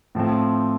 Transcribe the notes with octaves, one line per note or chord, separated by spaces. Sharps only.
A2 F3 C4